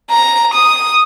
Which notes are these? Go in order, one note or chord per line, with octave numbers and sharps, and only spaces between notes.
A#5
D#6